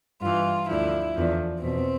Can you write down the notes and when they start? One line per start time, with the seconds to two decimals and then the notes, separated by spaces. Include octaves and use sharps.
0.21 G2 E3 F4
0.68 D2 D3 F3 E4
1.15 E2 D3 F3
1.62 E2 B2 C4